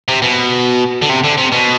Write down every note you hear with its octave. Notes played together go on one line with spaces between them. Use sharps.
C3
B2
D3
C3
D3
C3
B2